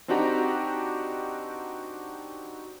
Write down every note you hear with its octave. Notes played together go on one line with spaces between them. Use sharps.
C4 D4 D#4 F#4 G4 A#5